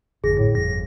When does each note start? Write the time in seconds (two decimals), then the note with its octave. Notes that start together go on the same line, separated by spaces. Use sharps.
0.24 G#1 F2 D3 G#4 A#6
0.37 A2
0.55 G1 F2 A#6